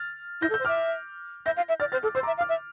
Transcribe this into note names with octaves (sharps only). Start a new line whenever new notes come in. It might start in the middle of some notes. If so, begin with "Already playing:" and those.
Already playing: F6 A6
E4 G6 A#6
A4
E6 G6
C5
E5 D6 F6
E5 G6 A#6
F5
E5
D5 F6 A6
C5 F6 A6
A4 D6 F6
C5 C6 E6
A#5 D6
E5
F5
D6 F6
E5